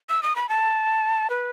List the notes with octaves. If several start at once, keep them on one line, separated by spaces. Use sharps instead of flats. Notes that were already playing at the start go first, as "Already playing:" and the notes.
E6
D#6
B5
A5
B4